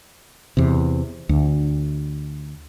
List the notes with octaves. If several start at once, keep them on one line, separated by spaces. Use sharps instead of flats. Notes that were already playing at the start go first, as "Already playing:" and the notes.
E2 C3
D2